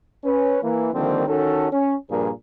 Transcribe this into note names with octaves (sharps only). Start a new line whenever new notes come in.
C#4 B4
E3 A#3
D3 D#3 F3 G3 A#3 C4
D#3 C#4 D#4 F#4 A4
C#4
G2 A#2 F3 A#3 G#4 A#4